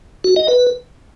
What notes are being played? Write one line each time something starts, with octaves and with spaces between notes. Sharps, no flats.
F#4
D#5
B4